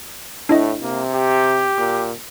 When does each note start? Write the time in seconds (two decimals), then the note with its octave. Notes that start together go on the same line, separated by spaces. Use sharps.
0.49 A2 D4 E4 D#5
0.82 C3 A#3
1.14 G4
1.78 A#2 D6